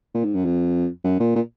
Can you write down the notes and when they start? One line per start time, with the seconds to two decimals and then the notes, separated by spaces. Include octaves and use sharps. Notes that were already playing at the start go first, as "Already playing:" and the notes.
0.14 A#2
0.24 G#2
0.34 F#2
0.45 F2
1.04 F#2
1.20 A#2
1.35 A#2